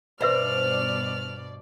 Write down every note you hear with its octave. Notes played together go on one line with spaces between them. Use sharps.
G2 B2 B4 C5 D5 E5 B5 F6